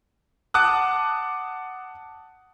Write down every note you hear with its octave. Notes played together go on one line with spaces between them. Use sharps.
F#5 A5 D6 D#6 F#6